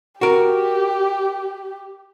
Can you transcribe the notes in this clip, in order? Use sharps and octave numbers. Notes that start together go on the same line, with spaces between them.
F#4 G4 A#4